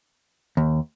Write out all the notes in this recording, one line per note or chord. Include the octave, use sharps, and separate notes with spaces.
D#2